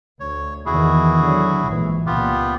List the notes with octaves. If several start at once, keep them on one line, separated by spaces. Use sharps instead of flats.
D2 C#5
E2 D#3 E4 F#4 G#4
D3 F#3
A#1 G#2 E3
C#2 A#2 B3 F4 G4